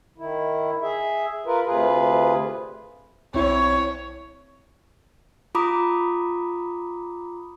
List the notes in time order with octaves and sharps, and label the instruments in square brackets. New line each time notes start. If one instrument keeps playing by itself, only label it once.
[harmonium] D#3 E4
G#4 E5
F4 A#4 B4
D2 C3 F4 G#4 B4
[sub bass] B1 [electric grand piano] C4 E4 [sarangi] C#5
[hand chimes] F4 A#5 B5 D6 D#6